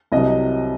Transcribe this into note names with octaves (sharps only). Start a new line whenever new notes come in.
C2 C3 F#3 D#5